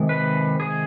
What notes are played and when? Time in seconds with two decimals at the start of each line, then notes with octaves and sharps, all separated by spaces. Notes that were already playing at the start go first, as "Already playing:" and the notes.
Already playing: C3 D#3 G#3
0.09 B4
0.60 G#4